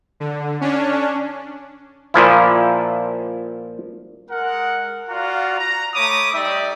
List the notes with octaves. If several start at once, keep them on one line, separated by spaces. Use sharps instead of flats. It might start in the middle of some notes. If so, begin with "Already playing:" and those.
D3
C#4 D4
A#2 F3 E4
G#3 A#4 F#5
F4 F#4 D5 F5 F#5 A#5
A#5
A3 C#5 B5 D6 D#6
G3 D#4 G4 D5 E5